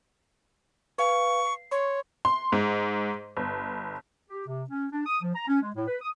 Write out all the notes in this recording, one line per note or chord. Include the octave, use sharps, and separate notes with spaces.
B4 F5 G#5 C#6
C7
C#5 C6 C#6
C6
G#2
G1
G4
C3
C#4
D4
D#6
F3
A#5
C#4
G#3
A2
B4
D#6